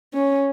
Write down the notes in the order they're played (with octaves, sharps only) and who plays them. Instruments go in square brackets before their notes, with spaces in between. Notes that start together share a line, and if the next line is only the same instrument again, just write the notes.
[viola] C#4